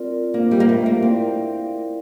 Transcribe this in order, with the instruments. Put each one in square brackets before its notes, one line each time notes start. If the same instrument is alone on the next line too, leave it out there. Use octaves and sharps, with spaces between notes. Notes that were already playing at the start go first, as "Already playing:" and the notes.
Already playing: [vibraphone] C4 F4 A#4 D5
[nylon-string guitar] A#3 [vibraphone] D4 F4 C5 F5
[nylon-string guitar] G3
A#3
A3
A#3
[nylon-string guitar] C4 [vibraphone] E4 A#4 D5 F5